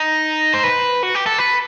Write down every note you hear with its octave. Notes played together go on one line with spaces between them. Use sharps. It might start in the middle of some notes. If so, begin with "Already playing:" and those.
Already playing: D#4
C5
B4
F#4
G4
A4
B4